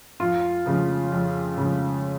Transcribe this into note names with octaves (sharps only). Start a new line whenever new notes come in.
F2 F4
C#3 F3
F2
C#3 F3